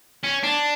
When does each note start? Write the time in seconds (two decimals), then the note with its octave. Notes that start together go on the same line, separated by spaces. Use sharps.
0.24 C#4
0.44 D4